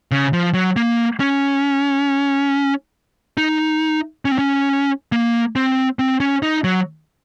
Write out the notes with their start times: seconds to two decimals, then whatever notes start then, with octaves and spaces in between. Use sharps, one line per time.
0.12 C#3
0.33 F3
0.54 F#3
0.76 A#3
1.20 C#4
3.37 D#4
4.25 C#4
4.32 C4
4.39 C#4
5.12 A#3
5.56 C4
5.99 C4
6.20 C#4
6.43 D#4
6.64 F#3